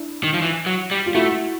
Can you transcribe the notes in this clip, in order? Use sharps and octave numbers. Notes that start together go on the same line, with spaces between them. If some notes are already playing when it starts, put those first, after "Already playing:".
Already playing: D4 E4
D#3
F3
E3
F#3
G3
F4
A3 E4 F#4